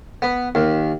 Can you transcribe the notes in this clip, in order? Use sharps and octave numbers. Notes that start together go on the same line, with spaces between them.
B3
D#2